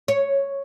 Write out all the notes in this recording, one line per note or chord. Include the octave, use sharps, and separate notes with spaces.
C#5